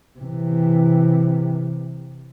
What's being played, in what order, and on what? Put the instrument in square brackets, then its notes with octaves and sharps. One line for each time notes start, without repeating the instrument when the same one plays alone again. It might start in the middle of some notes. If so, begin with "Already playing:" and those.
[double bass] C3 E3